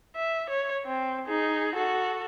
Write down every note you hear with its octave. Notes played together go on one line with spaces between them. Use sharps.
E5
C#5
C4
D#4 G#4
F#4 A4